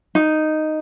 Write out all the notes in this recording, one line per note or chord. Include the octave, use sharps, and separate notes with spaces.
D#4